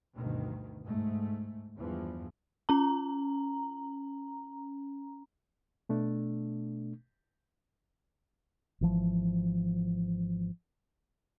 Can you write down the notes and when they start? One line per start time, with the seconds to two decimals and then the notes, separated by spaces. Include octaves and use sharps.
0.15 D2 G2 B2 D#3
0.83 G#2 A3
1.77 E2 G2 E3 F3
2.69 C#4 A#5
5.89 B2 A3 D4
8.81 G#1 E3 F3